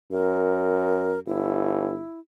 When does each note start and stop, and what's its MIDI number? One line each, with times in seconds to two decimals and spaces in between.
0.12 1.17 42
0.12 1.19 70
1.27 1.99 31
1.27 2.20 64